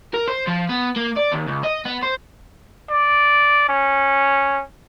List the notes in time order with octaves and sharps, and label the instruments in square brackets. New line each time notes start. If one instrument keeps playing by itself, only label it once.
[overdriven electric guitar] A#4
C5
F3
B3
A#3
D5
D#2
C#2
D#5
B3
C5
[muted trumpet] D5
C#4